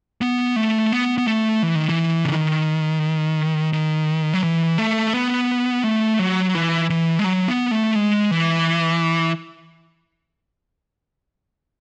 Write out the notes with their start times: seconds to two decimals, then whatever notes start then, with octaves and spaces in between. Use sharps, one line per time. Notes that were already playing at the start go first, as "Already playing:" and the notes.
0.21 B3
0.56 A3
0.92 B3
1.18 B3
1.27 A3
1.63 E3
1.76 D#3
1.89 E3
2.25 C#3
2.33 D#3
3.73 D#3
4.33 F#3
4.43 E3
4.78 A3
5.13 B3
5.84 A3
6.19 F#3
6.55 E3
6.90 E3
7.19 G#3
7.24 F#3
7.48 B3
7.71 A3
7.95 G#3
8.31 E3